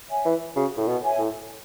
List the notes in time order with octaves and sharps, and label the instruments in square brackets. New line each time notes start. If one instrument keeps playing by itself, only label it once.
[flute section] C#5 E5 G#5
[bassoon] E3
[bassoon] C#3 [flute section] F#4
[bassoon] A2
B2
[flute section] C#5 E5 G#5
[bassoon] A2